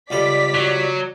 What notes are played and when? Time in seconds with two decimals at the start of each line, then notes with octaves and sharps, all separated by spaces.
0.10 C#2 G3 A4 D5 B6
0.54 F#3